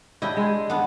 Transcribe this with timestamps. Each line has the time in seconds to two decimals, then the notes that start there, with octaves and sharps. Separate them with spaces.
0.22 D4 E4 G4 D#5
0.37 G#3 G#4
0.70 B3 D4